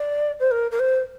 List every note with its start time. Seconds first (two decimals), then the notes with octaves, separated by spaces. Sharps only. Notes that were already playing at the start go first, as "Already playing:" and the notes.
Already playing: D5
0.40 C5
0.51 A#4
0.71 A#4
0.79 C5